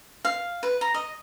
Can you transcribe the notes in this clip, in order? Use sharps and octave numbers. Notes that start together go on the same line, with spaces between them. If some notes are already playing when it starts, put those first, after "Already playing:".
F5
B4
A#5
D#5